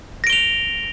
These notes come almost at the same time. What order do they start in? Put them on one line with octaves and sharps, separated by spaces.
A#6 D7 G7 F7